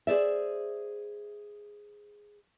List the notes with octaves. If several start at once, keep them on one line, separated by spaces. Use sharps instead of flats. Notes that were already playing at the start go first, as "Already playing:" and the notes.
G#4 C5 D5 E5